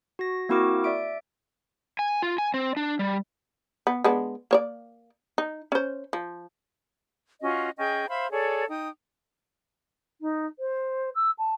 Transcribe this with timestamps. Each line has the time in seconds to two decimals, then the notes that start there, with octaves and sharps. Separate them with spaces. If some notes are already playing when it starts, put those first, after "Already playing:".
0.19 F#4 A#6
0.49 A#3 C4 E4 F#4 A#4 D6
0.84 D5 E5 D7
1.99 G#5
2.22 F4
2.38 G#5
2.54 C4
2.77 D4
2.99 G3
3.87 B3
4.04 G#3 B3 D4
4.51 A#3 C#5 D5
5.38 D#4
5.72 C#4 C5
6.13 F3
7.42 C#4 F4 F#4 D#5
7.77 C#4 G#4 D#5 G5
8.08 C5 E5 F5 B5
8.31 G#4 A4 C#5 D5
8.69 D#4 G5 D#6
10.21 D#4
10.59 C5
11.15 E6
11.39 A5